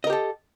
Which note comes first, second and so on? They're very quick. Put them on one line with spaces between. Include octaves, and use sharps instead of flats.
D#5 A#4 G4 A4